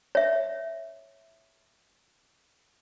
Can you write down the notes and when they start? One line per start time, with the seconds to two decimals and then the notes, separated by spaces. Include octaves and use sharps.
0.15 C#5 E5